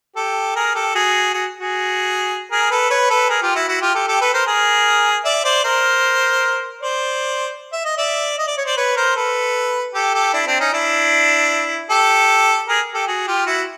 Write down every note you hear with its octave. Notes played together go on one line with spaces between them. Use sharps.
G4 A4
G#4 A#4
G4 A4
F#4 G#4
F#4 G#4
F#4 G#4
G#4 A#4
A4 B4
B4 C#5
A4 B4
G#4 A#4
F4 G4
E4 F#4
E4 F#4
F4 G4
G4 A4
G4 A4
A4 B4
A#4 C5
G#4 A#4
D5 E5
C5 D5
A#4 C5
C5 D5
E5
D#5
D5 E5
D#5
D5
C#5
C5 D5
B4 C#5
A#4 C5
A4 B4
G4 A4
G4 A4
D4 E4
C4 D4
C#4 D#4
D4 E4
G4 A4
G#4 A#4
G4 A4
F#4 G#4
F4 G4
E4 F#4